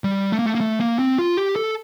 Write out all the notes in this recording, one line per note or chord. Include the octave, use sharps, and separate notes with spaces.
G3
A3
A#3
A3
A#3
A3
A#3
C4
F4
G4
A4